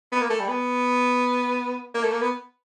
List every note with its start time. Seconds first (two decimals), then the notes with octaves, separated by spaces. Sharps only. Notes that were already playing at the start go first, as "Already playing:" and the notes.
0.12 B3
0.21 A#3
0.30 A3
0.40 G3
0.48 B3
1.95 A#3
2.03 A3
2.12 A#3
2.22 B3